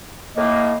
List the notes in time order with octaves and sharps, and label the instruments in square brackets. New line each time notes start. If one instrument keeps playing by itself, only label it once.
[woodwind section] A2 A#3 [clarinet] D#5